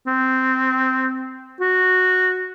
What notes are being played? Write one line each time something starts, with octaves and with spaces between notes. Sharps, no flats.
C4
F#4